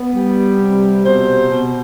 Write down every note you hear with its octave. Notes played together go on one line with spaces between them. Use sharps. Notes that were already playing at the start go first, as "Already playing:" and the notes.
Already playing: B3
G3
C3
B2 C5
B2